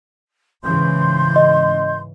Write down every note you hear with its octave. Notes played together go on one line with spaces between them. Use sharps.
G#2 C#3 E3 C6 G6
D#5